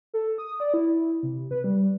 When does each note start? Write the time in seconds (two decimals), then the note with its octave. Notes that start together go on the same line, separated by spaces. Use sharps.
0.14 A4
0.38 D#6
0.60 D5
0.74 E4
1.23 C3
1.51 B4
1.64 G3